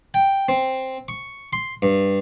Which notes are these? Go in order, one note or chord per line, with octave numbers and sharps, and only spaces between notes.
G5
C4
C#6
C6
G2